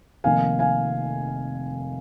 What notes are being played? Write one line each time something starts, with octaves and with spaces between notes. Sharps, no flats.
F1 F2 D#3 A#3 F5 G#5
F5 G#5